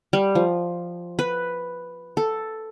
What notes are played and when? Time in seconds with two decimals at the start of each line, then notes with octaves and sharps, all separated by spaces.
0.13 G3
0.35 F3
1.19 B4
2.17 A4